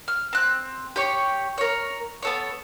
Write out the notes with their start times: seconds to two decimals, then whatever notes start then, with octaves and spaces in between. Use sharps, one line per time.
0.08 F6
0.33 C4 F#6
0.96 G4 C#5 C#6
1.58 A#4 C#5
2.22 B3 A4 C#5